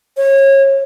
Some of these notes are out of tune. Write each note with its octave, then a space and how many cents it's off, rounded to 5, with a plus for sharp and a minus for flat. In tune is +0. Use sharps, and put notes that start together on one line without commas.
C#5 -25